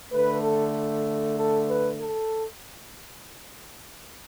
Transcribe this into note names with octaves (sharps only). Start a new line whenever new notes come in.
D3 A3 B4
A4
A4
B4
A4